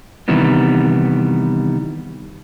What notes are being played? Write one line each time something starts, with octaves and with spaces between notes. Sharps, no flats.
C3 D#3 E3 G3 B3